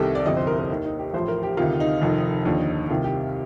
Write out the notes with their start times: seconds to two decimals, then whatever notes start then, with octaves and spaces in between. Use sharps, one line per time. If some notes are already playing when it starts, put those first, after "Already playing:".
Already playing: C2 C3 D#3 G4 A4
0.15 D5
0.26 G1 F2 C3 D#5
0.37 C5
0.47 A#4
0.58 A#4
0.70 D#2 D#3
0.84 D#4
0.99 G4
1.13 A1 A2 F3 C5
1.28 A#4
1.43 G4
1.57 D2 C3 D#3 F4
1.80 D#4
2.01 F1 F2 D#3
2.45 D#2 D3 F3
2.89 C2 C3 D#3 F4
3.04 G4